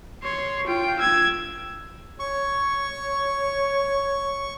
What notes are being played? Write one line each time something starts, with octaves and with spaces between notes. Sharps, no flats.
C#5 C6
F4 G5
E6 G#6
C#5 C#6